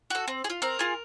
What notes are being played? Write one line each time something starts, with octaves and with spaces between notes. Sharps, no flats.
F#4 A4
C4
G#4
F4
C4 A#4
F4 G#4